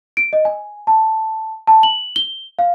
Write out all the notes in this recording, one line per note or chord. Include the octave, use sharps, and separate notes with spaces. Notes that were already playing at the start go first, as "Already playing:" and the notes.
D7
D#5
G#5
A5
A5
F#7
G7
F5